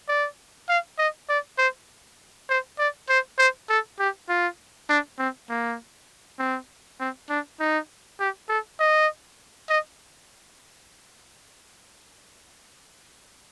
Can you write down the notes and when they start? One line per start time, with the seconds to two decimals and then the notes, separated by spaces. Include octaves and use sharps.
0.08 D5
0.69 F5
0.98 D#5
1.29 D5
1.58 C5
2.49 C5
2.79 D5
3.09 C5
3.38 C5
3.69 A4
3.99 G4
4.29 F4
4.89 D4
5.19 C4
5.49 A#3
6.39 C4
7.00 C4
7.30 D4
7.60 D#4
8.20 G4
8.49 A4
8.80 D#5
9.69 D#5